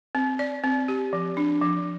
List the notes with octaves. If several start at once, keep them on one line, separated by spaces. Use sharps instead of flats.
C4
D5
C4
G4
F3
D4
F3